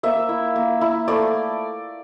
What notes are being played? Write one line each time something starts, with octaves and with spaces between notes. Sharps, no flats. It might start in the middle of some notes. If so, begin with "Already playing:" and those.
A#3 E5
E4
A#3
E4
A3 D5